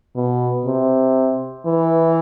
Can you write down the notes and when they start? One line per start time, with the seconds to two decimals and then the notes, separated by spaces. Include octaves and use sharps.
0.16 B2
0.66 C3
1.66 E3